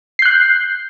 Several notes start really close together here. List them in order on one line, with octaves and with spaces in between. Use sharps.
C7 G6 F#6